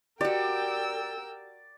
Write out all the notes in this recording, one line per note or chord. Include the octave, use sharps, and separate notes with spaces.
F#4 G4 A#4 D5 G5 E6